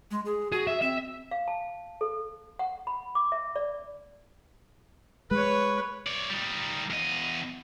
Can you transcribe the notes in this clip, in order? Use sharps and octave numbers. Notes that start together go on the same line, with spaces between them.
G#3
G#4
F#4 G#4
E5
C4 E5
F5
A5
A4
F#5
B5
D6
E5
D5
G#3 B4 C#5
C#5 D5
G3 D#4
E2 D#5